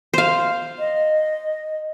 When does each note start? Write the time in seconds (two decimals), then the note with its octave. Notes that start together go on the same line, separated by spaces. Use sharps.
0.13 C5 F5
0.79 D#5